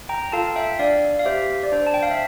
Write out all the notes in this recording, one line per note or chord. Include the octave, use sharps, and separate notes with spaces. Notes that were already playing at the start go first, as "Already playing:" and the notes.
G5 A#5
F4 A4 F5 A5
E5 G5
D4 D5 F5
F5
G4 C5 E5
D5
D4 C5
A5
G5
F5
E5